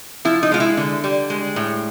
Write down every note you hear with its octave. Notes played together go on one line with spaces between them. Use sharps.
F3 E4
D#4
G#3 F4
E4
D3
G3
G#3
A2